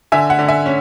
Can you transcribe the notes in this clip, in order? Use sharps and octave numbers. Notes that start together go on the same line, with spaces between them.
D3 E5 G#5
F#5
D3
E5 G#5
C#4